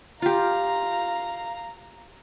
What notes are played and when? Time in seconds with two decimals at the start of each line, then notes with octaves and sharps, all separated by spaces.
0.22 F4 G4 F5 A#5